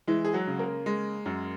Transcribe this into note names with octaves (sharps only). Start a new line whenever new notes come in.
E3 G#3 E4
G#4
F#3 F#4
C#3
A#3 A#4
G#3
F#2